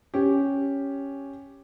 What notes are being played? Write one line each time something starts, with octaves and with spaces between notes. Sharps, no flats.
C#4 G4